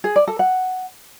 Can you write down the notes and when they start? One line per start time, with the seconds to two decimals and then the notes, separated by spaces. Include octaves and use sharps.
0.04 G#4
0.16 D5
0.27 A4
0.39 F#5